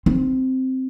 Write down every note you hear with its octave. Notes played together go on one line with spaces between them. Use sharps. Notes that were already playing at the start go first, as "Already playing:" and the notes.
C4